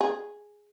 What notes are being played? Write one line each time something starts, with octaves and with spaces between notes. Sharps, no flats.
G#4